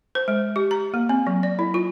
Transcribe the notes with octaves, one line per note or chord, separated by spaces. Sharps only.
C5
G#3
G4
A#5
A#3
C4
F#3
D5
E4
F4